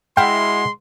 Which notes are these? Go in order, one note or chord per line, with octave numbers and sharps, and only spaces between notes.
G#3 E4 F#4 G5 C6 F6